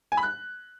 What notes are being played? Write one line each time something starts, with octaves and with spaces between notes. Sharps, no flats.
G#5
B5
F#6